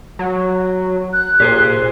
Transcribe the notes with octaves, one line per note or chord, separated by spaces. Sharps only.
F#3
F#6
A#2 G4 G#4 C5